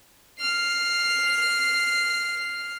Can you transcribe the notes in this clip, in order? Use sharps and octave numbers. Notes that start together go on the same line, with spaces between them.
F6 C7